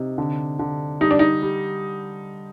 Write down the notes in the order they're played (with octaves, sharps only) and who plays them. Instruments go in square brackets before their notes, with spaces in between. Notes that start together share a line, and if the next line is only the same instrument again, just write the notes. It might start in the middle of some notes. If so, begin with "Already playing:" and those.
Already playing: [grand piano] C3 D#4
D3
D3
[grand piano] G3 [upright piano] D#4
[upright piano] D4
D#4
[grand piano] G3